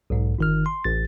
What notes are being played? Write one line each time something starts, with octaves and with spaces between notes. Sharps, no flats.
B1 G#2
G1 D#3 F6
C6
A1 A6